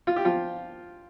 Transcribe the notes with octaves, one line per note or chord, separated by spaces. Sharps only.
F4
G4
F3 F4